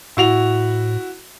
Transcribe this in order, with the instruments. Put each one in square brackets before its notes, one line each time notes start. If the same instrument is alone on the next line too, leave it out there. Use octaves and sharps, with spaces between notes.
[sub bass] A2 [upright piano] E4 F#4 F7